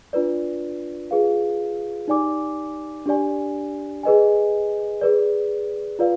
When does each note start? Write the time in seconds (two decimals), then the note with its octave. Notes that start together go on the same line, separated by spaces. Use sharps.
0.13 D4 F4 B4 D5
1.11 F4 G#4 B4 F5
2.08 D#4 G4 D5 G#5 D6
3.06 D4 G4 D5 G#5
4.03 G#4 B4 D#5 G#5
5.01 G#4 B4 D5
5.99 F4 B4 D5 F5